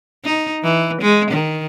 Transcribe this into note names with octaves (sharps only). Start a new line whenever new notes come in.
D#4
E3
G#3
D#3